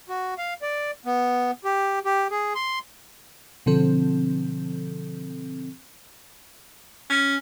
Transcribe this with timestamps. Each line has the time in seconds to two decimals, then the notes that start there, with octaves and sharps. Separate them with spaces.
0.09 F#4
0.38 F5
0.62 D5
1.06 B3
1.65 G4
2.05 G4
2.31 G#4
2.55 C6
3.66 B2 D3 F3 C4 A4
7.10 C#4